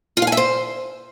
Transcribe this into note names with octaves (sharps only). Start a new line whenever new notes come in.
F4
F5
G#5
E5
C5